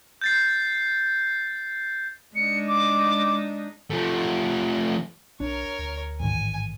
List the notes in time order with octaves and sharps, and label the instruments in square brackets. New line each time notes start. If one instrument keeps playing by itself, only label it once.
[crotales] G6 A6 C7
[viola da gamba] G#3 D4 D#4 [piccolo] C#7
[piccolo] D6
[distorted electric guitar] F3 A3
[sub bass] B1 [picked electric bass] D4 [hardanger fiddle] A#4 C#5
[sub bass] D2
[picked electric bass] A1 G#2 D#3 [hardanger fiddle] G#5